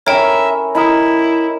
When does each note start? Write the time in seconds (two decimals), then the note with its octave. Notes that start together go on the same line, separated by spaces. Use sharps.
0.07 C#4 E4 A#4 C#5 E5 G5
0.75 E4 A#4 D#5 A#5 B5 D#6